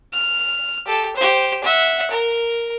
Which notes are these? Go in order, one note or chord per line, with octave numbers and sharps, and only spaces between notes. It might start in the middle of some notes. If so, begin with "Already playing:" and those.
F6
G4 A4
G4 C5
E5 F#5
A#4